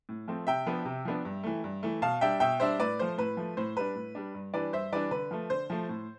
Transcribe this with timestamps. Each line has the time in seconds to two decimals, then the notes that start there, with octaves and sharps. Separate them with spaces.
0.09 A2
0.28 F3 A3 C4
0.47 C3 E5 G5
0.66 F3 B3 D4
0.85 C3
1.05 F3 B3 D4
1.25 G2
1.43 E3 A3
1.64 G2
1.83 E3 A3
2.02 B2 F5 A5
2.21 G3 D4 E5 G5
2.40 B2 E5 G5
2.60 G3 D4 C5 E5
2.79 A2 B4 D5
2.99 F3 A3 C5
3.18 A2 B4
3.37 F3 A3
3.57 A2 C5
3.77 G3 D4 B4
3.95 A2
4.15 G3 D4
4.35 G2
4.54 E3 G3 D4 B4 D5
4.73 G2 C5 E5
4.92 E3 G3 D4 B4 D5
5.11 D3 B4
5.31 F3 A3
5.50 D3 C5
5.70 F3 A3
5.89 A2